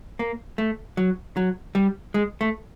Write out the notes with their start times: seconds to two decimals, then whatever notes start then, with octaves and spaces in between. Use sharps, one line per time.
0.19 A#3
0.58 A3
0.97 F#3
1.37 F#3
1.75 G3
2.14 G#3
2.41 A3